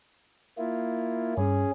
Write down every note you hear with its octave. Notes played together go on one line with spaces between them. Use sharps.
A#3 E4 F4
G2 C#4 G#4